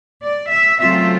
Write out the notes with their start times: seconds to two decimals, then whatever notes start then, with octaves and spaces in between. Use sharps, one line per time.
0.22 D5
0.51 E5
0.80 C#3 F#3 A3 C4 F4 E5